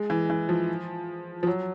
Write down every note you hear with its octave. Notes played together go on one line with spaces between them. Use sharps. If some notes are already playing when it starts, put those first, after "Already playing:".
Already playing: G#3
E3
E3
F3
F3
F#3